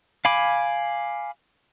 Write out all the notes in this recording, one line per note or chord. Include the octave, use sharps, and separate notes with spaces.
F5 G#5 B5 D6